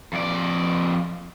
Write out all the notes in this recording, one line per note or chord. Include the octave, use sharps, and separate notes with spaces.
F2 D5